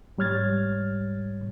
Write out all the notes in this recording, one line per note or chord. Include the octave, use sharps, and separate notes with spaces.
G#2 G3 C#5 F6 G#6 A6